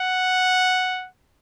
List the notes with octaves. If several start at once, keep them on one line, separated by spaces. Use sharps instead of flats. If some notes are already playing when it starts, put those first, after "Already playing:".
Already playing: F#5